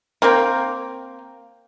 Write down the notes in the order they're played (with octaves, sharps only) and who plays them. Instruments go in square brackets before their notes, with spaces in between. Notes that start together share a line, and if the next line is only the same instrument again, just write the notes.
[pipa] A#3 C4 A#4 G5